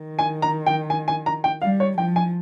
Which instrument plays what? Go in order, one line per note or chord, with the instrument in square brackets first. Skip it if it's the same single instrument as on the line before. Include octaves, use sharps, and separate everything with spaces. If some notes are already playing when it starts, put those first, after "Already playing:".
Already playing: [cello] D#3
[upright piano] G#5
A#5
G5
G#5
G#5
A#5
G5
[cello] G3 [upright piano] F5
[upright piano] C#5
[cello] F3 [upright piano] G5
[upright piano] G#5